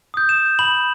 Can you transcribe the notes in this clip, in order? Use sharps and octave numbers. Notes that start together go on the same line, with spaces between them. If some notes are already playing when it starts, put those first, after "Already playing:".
D#6 G6
E7
B5 F#7